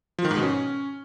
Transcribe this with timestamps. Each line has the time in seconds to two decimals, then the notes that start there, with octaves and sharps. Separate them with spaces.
0.18 F3
0.25 D#3
0.31 G#2
0.37 B2
0.43 C#4